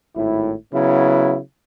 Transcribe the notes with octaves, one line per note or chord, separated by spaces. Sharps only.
G#1 A2 E4
C#3 F#3 B3 E4